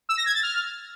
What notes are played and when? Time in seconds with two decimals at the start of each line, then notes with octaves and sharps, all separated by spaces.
0.09 E6
0.17 A#6
0.26 G#6
0.34 A6
0.43 F6